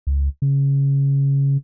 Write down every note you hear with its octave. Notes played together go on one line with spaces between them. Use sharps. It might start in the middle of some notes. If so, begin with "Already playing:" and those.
C#2
C#3